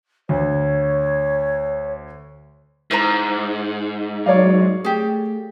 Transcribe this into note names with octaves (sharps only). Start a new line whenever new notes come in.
D2 C#5
G#2 E4 C5 A#5
F#3 C#5 D5 F5
A3 G4 G#4